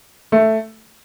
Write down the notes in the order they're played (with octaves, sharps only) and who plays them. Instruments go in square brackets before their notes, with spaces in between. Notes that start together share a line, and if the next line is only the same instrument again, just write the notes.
[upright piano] A3